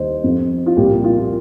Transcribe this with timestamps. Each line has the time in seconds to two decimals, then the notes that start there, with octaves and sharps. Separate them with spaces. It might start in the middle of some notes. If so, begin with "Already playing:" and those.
Already playing: D#2 D#3 G3 C5 D#5
0.24 F2 F3
0.66 F4
0.77 C2 A#2 G3 G4
1.04 F4